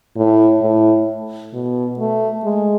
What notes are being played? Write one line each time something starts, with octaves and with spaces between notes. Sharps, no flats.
A2
A2
B2
A3
G#3